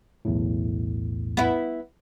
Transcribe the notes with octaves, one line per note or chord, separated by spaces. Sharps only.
B1 E2 A2
B3 E4